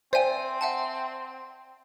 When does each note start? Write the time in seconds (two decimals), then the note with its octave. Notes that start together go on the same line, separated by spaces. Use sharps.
0.13 C4 C5 D5 E5 G5 G#5
0.61 E5 F#5 A5